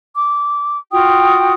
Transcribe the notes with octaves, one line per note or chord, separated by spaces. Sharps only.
D6
F4 F#4 G5 D#6